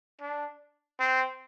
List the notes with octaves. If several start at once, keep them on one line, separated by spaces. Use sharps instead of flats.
D4
C4